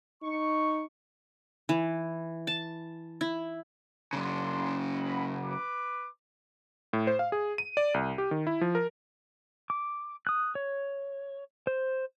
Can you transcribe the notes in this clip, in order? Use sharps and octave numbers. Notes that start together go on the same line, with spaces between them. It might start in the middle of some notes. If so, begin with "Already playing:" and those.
D#4 C#6
E3
A5
E4
F#2 C#3 D4 C6
G#3 B5
B4 D6
A2
C5
F5
G#4
D#7
D5
C2
G4
D#3
E4
F3
A#4
D6
D#6 F#6
C#5
C5